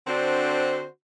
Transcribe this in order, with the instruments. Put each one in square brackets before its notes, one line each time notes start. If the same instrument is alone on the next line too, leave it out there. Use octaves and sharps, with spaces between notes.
[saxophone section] D3 C4 D4 F#4 C5